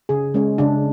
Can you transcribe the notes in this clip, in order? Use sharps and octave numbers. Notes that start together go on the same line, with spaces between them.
C#3 G#4
G#3 C#4
C#3 D4